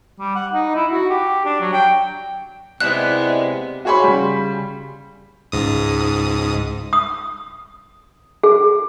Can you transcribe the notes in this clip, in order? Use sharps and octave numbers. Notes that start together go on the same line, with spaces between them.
G3
F#5
D#4
E4
F#4
G4
D4
F#3
G5
C3 G#3 B3 D#4 E4 D5 F#6
F#4 G#4 C#5 B5 C6
C#3 G3
C#2 G#2 D#6
D#6
G#4